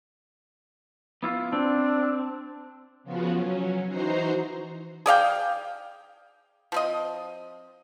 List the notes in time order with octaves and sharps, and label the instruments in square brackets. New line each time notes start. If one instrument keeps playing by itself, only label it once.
[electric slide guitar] B3 E4 F4
[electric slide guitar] C4 [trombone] D4
[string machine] C#3 F3 B3 F4 F#4
F#3 C#4
E3 D#4 F#4 C5 A#5 C7
[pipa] G#4 D5 F5 G5
F3 C4 D#5